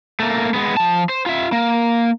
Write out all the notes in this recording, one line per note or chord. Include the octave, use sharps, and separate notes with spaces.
A3 A#3
G#3 B3
F3 A5
C5
F4 E5
A#3